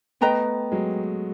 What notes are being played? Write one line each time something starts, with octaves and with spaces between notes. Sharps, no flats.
A3 B3 B4 D#5 G5 A#5
F#3 G#3